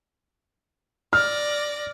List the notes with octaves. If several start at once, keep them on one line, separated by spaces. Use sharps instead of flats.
D5 F6 A#6